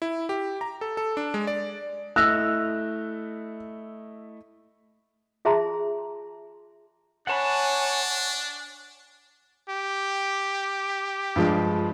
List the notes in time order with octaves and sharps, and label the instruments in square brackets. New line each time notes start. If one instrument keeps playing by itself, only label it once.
[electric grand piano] E4
G4
A#5
A4
A4
D4
G#3
D5
[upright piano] A3 E4 D#5 [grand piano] E6 [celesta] F#6 A#6 F7
[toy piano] F4 G#4 E5 A5 A#5 C6
[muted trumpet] D4 [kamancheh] C#5 G#5 [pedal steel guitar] F#5 A5 B5
[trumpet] G4
[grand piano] G2 F3 G#3